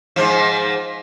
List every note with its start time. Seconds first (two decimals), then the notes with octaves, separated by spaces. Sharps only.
0.16 G#2 F3